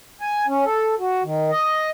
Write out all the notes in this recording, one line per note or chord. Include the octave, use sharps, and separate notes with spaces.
G#5
C#4
A4
F#4
D#3
D#5